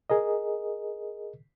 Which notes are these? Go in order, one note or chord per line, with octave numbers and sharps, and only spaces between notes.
G#4 A#4 D#5